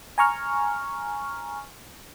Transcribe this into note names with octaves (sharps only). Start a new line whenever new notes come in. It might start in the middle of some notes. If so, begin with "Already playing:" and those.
G#5 A#5 C#6 F6